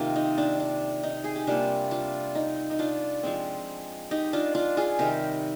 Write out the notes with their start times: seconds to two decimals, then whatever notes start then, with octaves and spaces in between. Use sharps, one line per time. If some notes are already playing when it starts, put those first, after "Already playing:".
Already playing: C3 D#3 A#3 F4
0.16 D#4
0.38 D4
0.60 D4
1.03 D#4
1.24 G#4
1.36 G4
1.47 C3 G3 A#3 D4 F4
1.91 D4 F4
2.35 D#4
2.71 D#4
2.79 D4 F4
3.23 F3 G#3 C4
4.11 D#4 G4
4.33 D4 F4
4.55 D4 F4
4.77 F4 G#4
4.99 C3 D#3 G3 G4 A#4